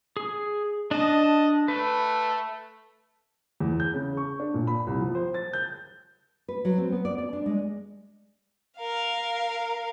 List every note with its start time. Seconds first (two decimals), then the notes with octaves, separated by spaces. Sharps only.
0.17 G#4
0.91 D4 D#5 A5
1.68 A3 B4
3.60 E2
3.80 G6
3.94 C#3
4.17 C#6
4.40 D4
4.54 A#2
4.67 B5
4.87 C2
5.01 F3
5.15 C5
5.34 A6
5.53 G6
6.48 B4
6.65 F#3
6.78 C4
6.92 B3
7.05 D5
7.18 D5
7.33 D4
7.46 G#3
8.80 A#4 F5